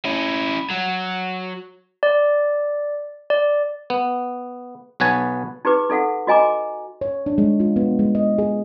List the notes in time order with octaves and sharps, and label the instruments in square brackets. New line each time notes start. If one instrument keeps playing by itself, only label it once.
[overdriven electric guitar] C#4 E4
F#3
[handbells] D5
D5
[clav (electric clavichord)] B3
B1 B3 B4 C#5 G#5 A5
[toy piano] D#4 G4 G#4 B4 D6
D#4 A4 F5 F#5
F#4 D#5 G#5 A#5 D6
[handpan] C#5
D4
G#3
F4
B3
G#3
D#5
G#4